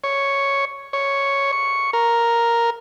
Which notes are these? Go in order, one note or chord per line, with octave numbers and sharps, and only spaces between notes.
C#5
C#5
C#6
A#4